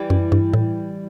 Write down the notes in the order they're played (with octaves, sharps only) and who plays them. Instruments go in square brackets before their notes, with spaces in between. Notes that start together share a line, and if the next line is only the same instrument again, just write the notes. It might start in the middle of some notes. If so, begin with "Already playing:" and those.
Already playing: [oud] E3 G3
[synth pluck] F#2
G2
A2